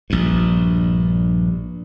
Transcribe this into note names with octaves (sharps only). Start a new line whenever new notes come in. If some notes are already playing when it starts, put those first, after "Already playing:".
A#1 G2